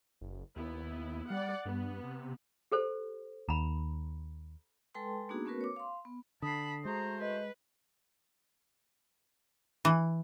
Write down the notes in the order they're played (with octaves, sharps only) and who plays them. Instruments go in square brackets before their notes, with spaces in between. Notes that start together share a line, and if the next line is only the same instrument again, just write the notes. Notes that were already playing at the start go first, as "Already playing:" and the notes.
[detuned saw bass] F#1
[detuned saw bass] D#2 [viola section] B3 E4
[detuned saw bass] G3 [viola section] D5 F#5
[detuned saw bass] G2 [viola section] B3
[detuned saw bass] C3
[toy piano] G4 A4 C5
[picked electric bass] D#2 [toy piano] A#5 B5
[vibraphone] G#3 A4 B4 G5 A5 C6
A#3 B3 D4 D#4 F#4 G#4
A3 B3 C#4 F#4 A#4 B4
C#5 D6
F5 C6
B3
[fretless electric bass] D3 [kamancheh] A5 B5 [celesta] D#6 C7
[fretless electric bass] G#3 [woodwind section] A3 F#4 C5 [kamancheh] A#5
[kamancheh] B4 [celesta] D#5
[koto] E3